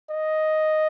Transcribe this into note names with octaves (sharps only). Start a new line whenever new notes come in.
D#5